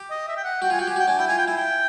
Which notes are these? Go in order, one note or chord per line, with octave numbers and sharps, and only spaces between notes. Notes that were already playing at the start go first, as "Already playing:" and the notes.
Already playing: G4
D#5
E5
G5
F#5
F#4 G5
F4 G#5
F#4 G5
G4 G#5
F#4 G5
D4 G#5
E4 G5
F4 G#5
G5
E4 G#5
G5